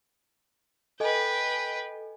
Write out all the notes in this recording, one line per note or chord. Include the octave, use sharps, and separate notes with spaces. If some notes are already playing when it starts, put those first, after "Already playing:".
A4 B4 D#5 G5 G#5